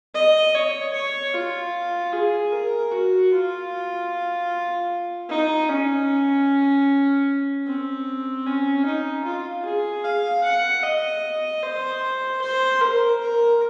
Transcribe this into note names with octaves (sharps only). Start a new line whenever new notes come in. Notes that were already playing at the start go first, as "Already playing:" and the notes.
D#5
C#5
C#5
F4
G#4
A#4
F#4
F4
D#4
C#4
C4
C#4
D#4
F4
G#4
F5
F#5
D#5
C5
C5
A#4
A#4